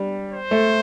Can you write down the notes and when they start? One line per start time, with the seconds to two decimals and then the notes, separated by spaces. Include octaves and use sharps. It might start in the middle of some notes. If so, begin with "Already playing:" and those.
Already playing: G3 D4
0.33 C5
0.51 A3